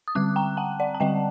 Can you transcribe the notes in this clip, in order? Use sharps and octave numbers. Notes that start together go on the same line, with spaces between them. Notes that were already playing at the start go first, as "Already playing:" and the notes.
D#6
D3 G3 C4 D6 F#6
G5 A#5
F#5 A5
D5 F#5
A5
D3 G3 C4 D#5 G5